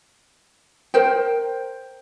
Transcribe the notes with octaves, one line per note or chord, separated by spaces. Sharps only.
A#4 C5 G5